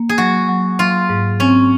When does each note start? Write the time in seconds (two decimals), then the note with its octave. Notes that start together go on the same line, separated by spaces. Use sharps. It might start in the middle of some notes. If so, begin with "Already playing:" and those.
Already playing: A#3
0.09 G#4
0.18 F#3 F#4
0.49 F#3
0.79 F#3 F4
1.09 G#2
1.40 C4 C#4